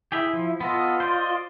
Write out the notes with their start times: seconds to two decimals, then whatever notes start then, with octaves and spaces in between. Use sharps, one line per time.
0.12 E4 G4 G#4 E5
0.33 F3
0.60 B3 F4 A4 D#5
1.00 C5 D5 D#5